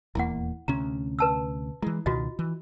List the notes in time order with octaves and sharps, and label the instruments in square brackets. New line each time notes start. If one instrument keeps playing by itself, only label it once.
[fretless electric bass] D#1 E2 A#3 [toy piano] E4 F#5
[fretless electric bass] D2 C3 C#4 [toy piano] A#5
[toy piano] B4 A5 E6
[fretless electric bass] E3 G#3 [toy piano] E4
[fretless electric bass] C#2 B2 D#3 [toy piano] F4 F#4 D#5
[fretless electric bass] E3